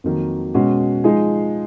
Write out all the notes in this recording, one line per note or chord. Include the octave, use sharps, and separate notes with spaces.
F2 D#3 F#3 A#3
B2 G#3 C#4 F#4
F3 G#3 D#4 G#4